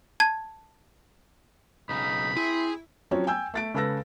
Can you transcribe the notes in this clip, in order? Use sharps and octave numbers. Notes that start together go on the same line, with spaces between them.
A5 G#6
B1 C#3 D#4 B5
C4 E4 G#4
F3 F#3 C4 C#4
G5 G#5 E6 G6
A3 A6 D7
C#3 G#3 A4 B4 E6 A#6